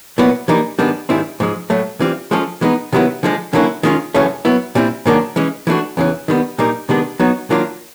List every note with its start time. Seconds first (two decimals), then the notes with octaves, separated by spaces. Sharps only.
0.18 A#2 F#3 B3 E4
0.48 E3 G3 A#3 D#4
0.79 G#2 D#3 G3 B3 D4
1.09 G#2 D#3 G3 C4 E4
1.40 G#2 F3 G#3
1.70 A2 F#3 A3
2.00 E3 G3 C4 F4
2.31 F3 G#3 C#4 F4 A4
2.61 E3 G#3 B3 D#4
2.93 C3 D#3 F#3 B3 E4
3.23 D3 F3 G#3
3.53 D3 F#3 A#3 C#4 E4
3.83 D#3 G#3 C#4 F4
4.14 F#2 C#3 E3 A3 C#4
4.45 F#3 B3 E4
4.75 A#2 G3 C4 E4
5.06 G#2 D#3 F#3 A#3 D4
5.36 E3 G#3 C#4
5.67 E3 A3 D4 F#4
5.97 E2 C#3 E3
6.28 D#3 G3 B3
6.58 A#2 G3 A#3 D#4
6.89 C3 D#3 G#3 B3 D4
7.20 F#3 B3 D#4 F#4
7.50 D#3 F#3 A#3 D4 F4